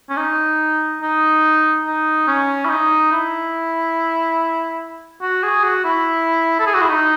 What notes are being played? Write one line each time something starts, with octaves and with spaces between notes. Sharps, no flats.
C#4
D#4
D#4
D#4
C#4
E4
D#4
E4
F#4
G#4
F#4
E4
A4
G#4
F#4
E4
D#4